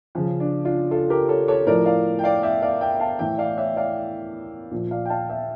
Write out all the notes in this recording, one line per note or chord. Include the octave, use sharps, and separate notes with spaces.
C#3 F3 C#4
D4
D4 F4
F4 A4
G4 A#4
A4 C#5
A4 C#5
A2 F3 A#4 D5
D5 F5
G5
D5 F5
E5 G5
D5 F5
E5 G5
F5 A5
A2 E3 E5 G5
D5 F5
C#5 E5
D5 F5
A#2 F3
D5 F5
G5
F5 A5
E5 G5